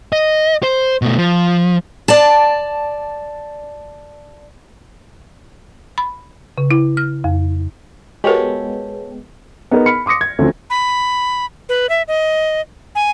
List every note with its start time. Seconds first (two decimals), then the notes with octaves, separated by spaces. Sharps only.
0.13 D#5
0.63 C5
1.02 B2 A3
1.18 F3
2.08 D5 A5
5.98 B5
6.58 C#3
6.71 E4
6.97 F6
7.24 F2
8.24 G#3 B3 F#4 G4 A4 A#4 C#5
9.71 B3 D#4 G#4 A#4
9.86 B5 F6 C#7
10.06 C6 D6 D#6 A#6 C#7
10.21 G#6
10.39 D2 C#3 F3 A3 C4
10.70 B5
11.69 B4
11.89 E5
12.08 D#5
12.95 G#5